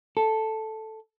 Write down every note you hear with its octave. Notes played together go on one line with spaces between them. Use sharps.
A4